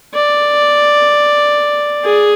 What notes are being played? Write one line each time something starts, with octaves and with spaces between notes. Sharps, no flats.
D5
G#4